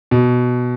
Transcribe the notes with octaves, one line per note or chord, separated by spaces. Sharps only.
B2